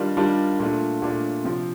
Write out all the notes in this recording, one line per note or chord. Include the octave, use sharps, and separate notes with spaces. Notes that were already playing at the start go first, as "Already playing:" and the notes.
Already playing: D#3 G3 D4 F4
D#3 G3 D4 F4
A#2 A3 D4 F4
A#2 A3 D4 F4
C3 F3 C4 F4